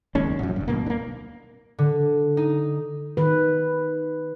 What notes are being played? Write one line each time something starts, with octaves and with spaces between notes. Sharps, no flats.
F#1 D#2 G#3 C#4
A#1 F#2
F#1 G2
D1 G#1 B2 A#3
A#3 D4
D3
D#4
D#3 B4